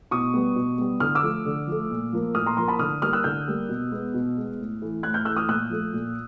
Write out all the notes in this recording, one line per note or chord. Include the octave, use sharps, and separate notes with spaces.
B2 C#6 D#6
G3 B3
B2
G3 B3
D3 D#6 F6
D6 E6
F3 A3
D3
F3 A3
A#2
F3 A#3
A#2 D#6 F6
A#5 C6
F3 A#3 A#5 C6
A5 B5
D3 D#6 F6
G3 A#3 D#6 F6
E6 F#6
D3 F6 G6
G3 A#3
B2
G#3 B3
B2
G#3 B3
A2
E3 A3
A2 F#6 G#6
F6 G6
E3 A3 E6 F#6
D#6 F6
A#2 E6 F#6
F3 A3
A#2